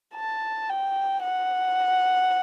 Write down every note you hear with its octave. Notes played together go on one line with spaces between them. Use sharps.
A5
G5
F#5